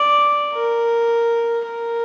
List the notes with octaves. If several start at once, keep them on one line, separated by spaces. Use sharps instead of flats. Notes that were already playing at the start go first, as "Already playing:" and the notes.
Already playing: D5
A#4
A#4